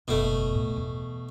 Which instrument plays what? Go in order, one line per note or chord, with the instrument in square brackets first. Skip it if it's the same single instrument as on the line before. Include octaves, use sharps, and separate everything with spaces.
[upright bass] F#1 E2 [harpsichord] B2 A3
[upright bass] A2
E2